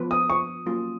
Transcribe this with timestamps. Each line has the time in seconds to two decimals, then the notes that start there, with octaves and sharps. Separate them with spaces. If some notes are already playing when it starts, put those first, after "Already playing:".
Already playing: F3 B3 F4 B4
0.11 D#6
0.30 C#6
0.66 F#3 A#3 C#4 F4